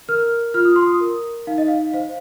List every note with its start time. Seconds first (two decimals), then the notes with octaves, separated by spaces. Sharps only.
0.09 A#4 F6
0.54 F4 F6
0.65 D#6
0.76 C6
0.86 D#6
1.01 A#4
1.47 D#4 F5
1.58 D#5
1.68 F5
1.94 C5 F5